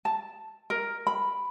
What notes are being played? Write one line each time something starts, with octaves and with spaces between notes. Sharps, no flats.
A5
A#4
B5